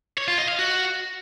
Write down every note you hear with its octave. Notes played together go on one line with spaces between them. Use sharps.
C#5
F4
D#5
F5
F#4